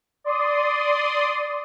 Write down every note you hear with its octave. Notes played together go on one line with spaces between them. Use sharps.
D5 C6 D#6